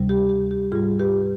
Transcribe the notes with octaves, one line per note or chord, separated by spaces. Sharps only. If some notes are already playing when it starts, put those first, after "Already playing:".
Already playing: D2 C3 G3
G4
G4
G4
G#2 G3 F4 G#4
G4 B4